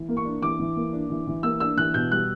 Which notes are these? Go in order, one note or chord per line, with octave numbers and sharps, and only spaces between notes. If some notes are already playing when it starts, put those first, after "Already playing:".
Already playing: E3
A#3
C#6
D4
E3 D6
E3
A#3
D4
E3
E3
A#3 E6
D4 E6
E3 F#6
B2 G6
G3 F#6